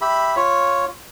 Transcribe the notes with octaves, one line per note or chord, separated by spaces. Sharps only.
G4 E5 B5
F4 C#5